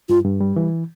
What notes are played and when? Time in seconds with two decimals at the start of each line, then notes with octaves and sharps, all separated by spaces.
0.09 G2 F4
0.25 G2
0.41 G3
0.56 E3